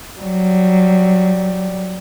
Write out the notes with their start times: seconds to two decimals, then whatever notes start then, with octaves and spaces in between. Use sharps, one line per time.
0.21 F#3 G3